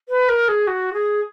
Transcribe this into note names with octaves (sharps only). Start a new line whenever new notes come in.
B4
A#4
G#4
F#4
G#4